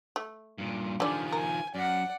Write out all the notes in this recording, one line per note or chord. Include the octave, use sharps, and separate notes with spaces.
A3
G2 A#2
D3 D#3 F3 G4 D5 G#5
A#4 G#5
F#2 D5 F#5